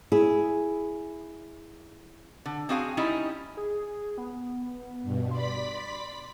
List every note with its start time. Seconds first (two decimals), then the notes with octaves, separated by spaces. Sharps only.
0.12 E4 G#4
2.46 D3
2.69 C4 D4 F#4 G#4 F5 G#5
2.97 G3 C#4 D#4 E4
3.57 G#4
4.18 B3
5.03 G2 B2
5.31 D5 B5 C6 B6